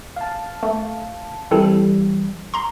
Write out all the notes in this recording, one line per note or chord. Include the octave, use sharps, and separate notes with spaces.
F5 A5
A3
E3 G3 C4 E4 A4
A#5 C6